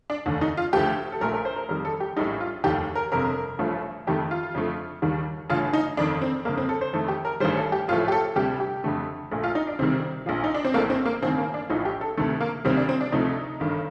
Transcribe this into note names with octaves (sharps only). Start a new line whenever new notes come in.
D4
F1 D#2 D3
D#4
F4
D2 D3 F3 A3 G4
A4
A#1 A#2 A3 A#4
A#4
C5
A#4
F2 D#3 G3 A#4
A4
G4
A#1 A2 G3 D#4
F4
F1 D#2 D#3 G4
A#4
G1 F2 C3 A#4
A1 G2 F3 A3
F2 D#3 A3 G4
F4
F2 D3 F3 A3
D#2 D#3 G3
A1 G2 D3 F4
D#4
G1 F2 D#3 D4
C4
G1 F2 D3 A#3
C4
A4
C5
F2 D#3 A3 A4
G4
A#4
A1 G2 D#3 G3 C5
A4
G4
A1 A2 F3 A3 F4
G4
A4
D2 C3 G3 G4
G4
F2 D3 A3
A#1 A#2 A3
F4
D#4
D4
D2 C3 D#3 G3 C4
A#1 A#2 F3
D#4
D4
C4
A#1 A2 A3 A#3
C4
A#3
A1 G2 D#3 C4
A#3
D4
A#1 A2 F3 D#4
G4
A4
D2 C3 D#3 A3 A4
A#3
D2 C3 D#3 G3 C4
D4
C4
D4
D2 C3 F3 A3 D#4
G1 G2 D#3